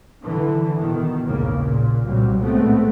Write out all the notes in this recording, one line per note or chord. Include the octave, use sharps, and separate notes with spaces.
D3 E3
B2 D#3
A#1 D#2 G#2 C#3 A#3
A#2
C2 A#2 F#3 G3
A2 G#3 A3 B3 C4